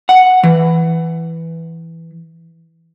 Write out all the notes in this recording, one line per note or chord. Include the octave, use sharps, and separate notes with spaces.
F#5
E3